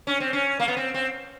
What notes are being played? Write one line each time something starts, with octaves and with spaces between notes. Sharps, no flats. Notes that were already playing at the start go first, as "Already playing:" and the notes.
C#4
C4
C#4
A#3
B3
C4
C4